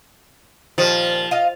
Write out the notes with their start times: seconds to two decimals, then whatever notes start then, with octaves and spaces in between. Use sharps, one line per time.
0.78 A#2 D#3 F3 G3
1.31 F4 D#5 F5